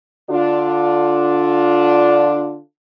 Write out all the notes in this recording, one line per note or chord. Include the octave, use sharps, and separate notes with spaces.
D3 D4 F4